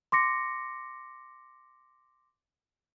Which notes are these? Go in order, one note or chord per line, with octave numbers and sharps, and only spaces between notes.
C6 D6 A#6 C#7